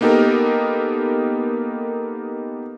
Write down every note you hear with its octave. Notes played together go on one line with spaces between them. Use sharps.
A#3 B3 D#4 G4 A4 A#4